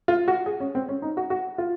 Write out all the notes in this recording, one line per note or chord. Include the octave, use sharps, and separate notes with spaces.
F4
F#4
G#4
C#4
C4
C#4
D#4
F#4
F#4
F4